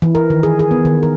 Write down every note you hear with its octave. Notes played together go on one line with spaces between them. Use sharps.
E3
A#4
D#3
G#4
G#4
B3
D#3
A#4